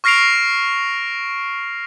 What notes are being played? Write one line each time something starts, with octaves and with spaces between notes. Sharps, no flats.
C#6 F6 A#6 C7 D7 F7